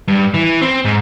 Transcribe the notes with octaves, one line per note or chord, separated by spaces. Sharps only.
G2
E3
C4
G#2